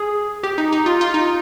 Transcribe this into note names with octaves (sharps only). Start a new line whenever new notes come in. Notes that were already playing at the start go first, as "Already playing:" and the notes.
Already playing: G#4
G4
D#4
D#4
F4
F4
D#4